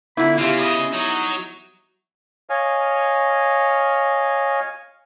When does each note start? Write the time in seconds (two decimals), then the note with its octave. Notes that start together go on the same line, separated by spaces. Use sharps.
0.17 D3 B3 E4 F4 B5
0.38 C#3 B3 E4 G4 F5
0.59 D#5
0.93 F#3 D#4
2.50 C#5 D#5 F5 G#5